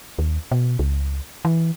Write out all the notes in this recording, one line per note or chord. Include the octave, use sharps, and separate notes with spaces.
D#2
B2
C#2
E3